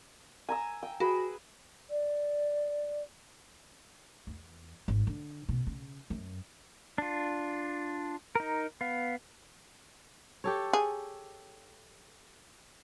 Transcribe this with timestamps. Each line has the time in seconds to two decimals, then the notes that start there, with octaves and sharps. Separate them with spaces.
0.49 G#5 A#5 E6
0.83 G5
1.00 F#4 G#4 B4
1.90 D5
4.27 E2
4.88 G#1
5.07 D3
5.49 B2
5.67 C#3
6.10 F#2
6.98 D4 F4
8.35 D#4 A#4
8.81 B3 F5
10.44 G4 A4 C#5
10.73 G#4